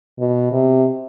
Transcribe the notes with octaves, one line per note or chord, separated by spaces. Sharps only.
B2
C3